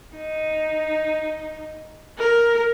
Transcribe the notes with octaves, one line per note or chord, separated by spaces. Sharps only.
D#4
A#4